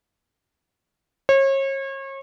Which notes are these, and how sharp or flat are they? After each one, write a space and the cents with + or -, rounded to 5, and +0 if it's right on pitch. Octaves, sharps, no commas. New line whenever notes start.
C#5 -35